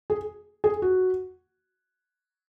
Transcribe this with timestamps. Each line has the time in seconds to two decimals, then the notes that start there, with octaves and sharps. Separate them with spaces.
0.10 G#4
0.64 G#4
0.82 F#4